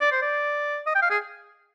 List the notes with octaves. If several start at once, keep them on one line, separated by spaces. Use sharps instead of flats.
D5
C5
D5
D#5
G5
F5
G#4